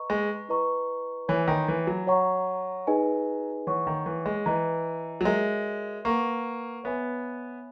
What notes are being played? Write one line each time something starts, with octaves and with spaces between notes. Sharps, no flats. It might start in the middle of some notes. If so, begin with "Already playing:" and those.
Already playing: B4 D#5 A#5 C#6
G#3
E4 B4 D#5 A#5 C#6
E3 C#5 G#5 B5
D#3
E3
F#3
C#5 F#5 A#5 C#6
D#4 G#4 B4 D#5 G#5
E3 C#5 F#5 C#6
D#3
E3
G#3
E3 B4 D#5 A#5
F#3
G#3 F#4 A#4 C#5 E5
A#3 B4 F#5 C#6
B3 C#5 E5 G#5 B5